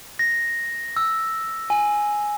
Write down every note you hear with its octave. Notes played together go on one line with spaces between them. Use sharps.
A#6
E6
G#5